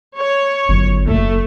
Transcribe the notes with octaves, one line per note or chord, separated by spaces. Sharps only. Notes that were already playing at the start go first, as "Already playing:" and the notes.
C#5
G1 F#2 C#3
F#1 A3